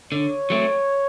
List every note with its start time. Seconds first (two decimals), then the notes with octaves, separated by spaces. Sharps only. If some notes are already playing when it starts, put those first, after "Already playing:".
0.12 D3 C#5
0.50 F#3 A3 C4